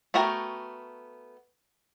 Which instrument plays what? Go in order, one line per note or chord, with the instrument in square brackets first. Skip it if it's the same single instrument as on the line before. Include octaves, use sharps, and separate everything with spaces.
[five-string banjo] A3 B3 F#4 A#4 G5